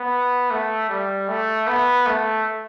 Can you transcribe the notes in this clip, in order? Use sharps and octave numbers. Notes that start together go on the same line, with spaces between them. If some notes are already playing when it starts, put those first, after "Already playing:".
Already playing: B3
A3
G3
A3
B3
A3